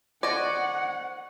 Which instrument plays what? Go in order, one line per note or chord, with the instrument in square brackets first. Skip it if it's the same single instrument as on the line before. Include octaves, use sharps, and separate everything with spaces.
[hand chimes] C5 C#6 G#6 [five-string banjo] D5 D#5 [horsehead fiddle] F#5